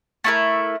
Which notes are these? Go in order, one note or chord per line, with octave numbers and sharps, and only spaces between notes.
A3 E4 A#4